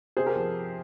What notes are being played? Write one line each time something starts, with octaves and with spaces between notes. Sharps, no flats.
C3 G#4 C5
G4 A#4
F3